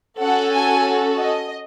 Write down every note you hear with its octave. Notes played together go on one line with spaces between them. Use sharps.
C#4 F#4 A4 F#5
G#5
D#5